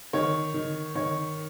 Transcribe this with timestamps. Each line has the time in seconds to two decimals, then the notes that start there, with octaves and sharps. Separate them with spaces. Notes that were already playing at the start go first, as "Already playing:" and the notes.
0.13 D#3 C#5
0.54 D#3
0.95 D#3 C#5